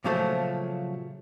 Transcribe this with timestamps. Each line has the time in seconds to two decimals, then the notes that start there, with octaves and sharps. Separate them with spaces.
0.04 A#2 C#3 F3 F#3 A3